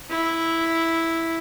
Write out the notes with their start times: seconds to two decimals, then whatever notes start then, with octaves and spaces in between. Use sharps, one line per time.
0.10 E4